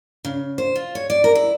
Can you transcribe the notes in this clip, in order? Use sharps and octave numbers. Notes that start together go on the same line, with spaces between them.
C#3
C5
F4
C#5
D5
A#4
E4